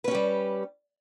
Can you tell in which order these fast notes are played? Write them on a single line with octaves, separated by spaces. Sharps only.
B4 C#4 G4 G3